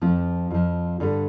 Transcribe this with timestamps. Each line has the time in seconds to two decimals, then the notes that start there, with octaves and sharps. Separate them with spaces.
0.01 F2 F3 C4 F4
0.50 F2 F3
1.00 G2 D3 G3